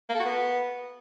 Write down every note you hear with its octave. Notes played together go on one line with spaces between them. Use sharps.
A#3
A4
F#4
B3